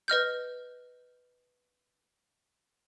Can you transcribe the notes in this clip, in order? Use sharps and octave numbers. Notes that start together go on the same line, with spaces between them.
B4 D#5 F6 G6